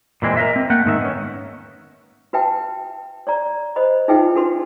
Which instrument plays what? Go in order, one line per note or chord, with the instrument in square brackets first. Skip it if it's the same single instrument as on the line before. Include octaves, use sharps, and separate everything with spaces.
[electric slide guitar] A#2 E3 G#3 C4
A#4 B4 D#5 E5
C4
A3 A#3 F#5 G5
G#2 D#3 E5
B3 C#4
[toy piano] F#4 B4 E5 G5 A5
C#5 D5 A#5
C5 D#5 B5
D#4 F4 G#4 B4 E5 G5
D4 F#4 A4 B4 C6